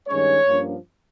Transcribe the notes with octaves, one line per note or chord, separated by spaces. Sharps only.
G2 D#3 G#3 C#4 C#5
G2 F3 A#3 C#4